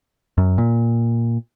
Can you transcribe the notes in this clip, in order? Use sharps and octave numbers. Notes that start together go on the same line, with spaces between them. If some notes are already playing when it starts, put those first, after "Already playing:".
F#2
A#2